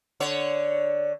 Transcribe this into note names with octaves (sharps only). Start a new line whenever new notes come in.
D3 C#5